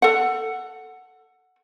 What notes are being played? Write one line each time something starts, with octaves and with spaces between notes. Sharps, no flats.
A4 F#5